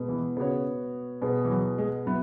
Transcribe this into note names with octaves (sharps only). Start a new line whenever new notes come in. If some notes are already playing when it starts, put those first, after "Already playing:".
Already playing: B2 G#3 B3
E3
C#3 B3 F#4 C#5
B2 B3 G#4
E3
F#3
G#3
F#3 B3 E4